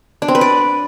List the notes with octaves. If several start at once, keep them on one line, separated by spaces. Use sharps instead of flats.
D4
C4
B4
D5